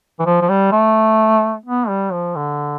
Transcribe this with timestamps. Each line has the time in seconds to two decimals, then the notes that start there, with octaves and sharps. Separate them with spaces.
0.19 E3
0.26 F3
0.41 F3
0.50 G3
0.72 A3
1.66 B3
1.88 G3
2.12 F3
2.36 D3